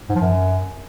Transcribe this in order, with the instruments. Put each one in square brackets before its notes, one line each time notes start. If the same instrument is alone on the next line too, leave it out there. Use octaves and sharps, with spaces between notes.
[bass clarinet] G#2
F3
F#2